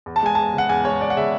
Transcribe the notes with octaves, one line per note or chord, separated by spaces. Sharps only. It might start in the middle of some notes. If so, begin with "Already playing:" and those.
E2
A5
G#3 G#5
E2 A5
C#3 F#5
E2 G#5
G#3 C#5
E2 D5
F#5
C#3 E5